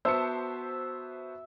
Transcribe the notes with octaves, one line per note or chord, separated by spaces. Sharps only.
B3 F#4 C5 E5 A5 C#7